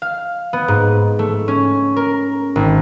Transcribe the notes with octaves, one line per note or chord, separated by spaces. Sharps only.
F5
B3
G#2
A3
C#4
A#4
G#1